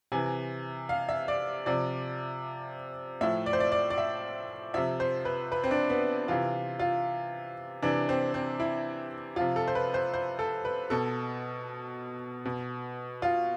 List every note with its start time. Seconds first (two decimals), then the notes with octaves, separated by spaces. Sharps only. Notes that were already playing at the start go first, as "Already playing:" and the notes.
0.12 C3 E3 G#5
0.89 F5
1.09 E5
1.28 D5
1.66 C3 F3 D5
3.21 A2 F3 E5
3.46 D5
3.53 C5
3.60 D5
3.72 D5
3.90 D5
3.98 E5
4.74 C3 F3 E5
5.00 C5
5.25 B4
5.52 B4
5.64 C4
5.71 D4
5.90 B3
6.28 C3 E3 F4
6.79 F4
7.82 C3 E3 D4
8.09 C4
8.34 C4
8.60 E4
9.36 C3 F3 F4
9.56 A4
9.68 C5
9.75 B4
9.94 C5
10.14 C5
10.39 A4
10.65 B4
10.90 B2 A4
12.45 B2
13.22 F4